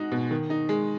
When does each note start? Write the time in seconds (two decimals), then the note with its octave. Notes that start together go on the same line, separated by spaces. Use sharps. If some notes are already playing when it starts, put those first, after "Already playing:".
Already playing: G#3 D#4 F#4
0.12 B2
0.31 D#3
0.50 D#4
0.69 G#3